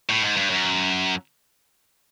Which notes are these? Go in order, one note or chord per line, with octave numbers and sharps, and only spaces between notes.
A2
G#2
G2
F#2